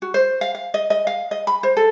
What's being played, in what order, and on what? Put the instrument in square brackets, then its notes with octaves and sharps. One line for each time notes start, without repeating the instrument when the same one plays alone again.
[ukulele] F#4
C5
F5
F5
D#5
D#5
F5
D#5
B5
C5
A4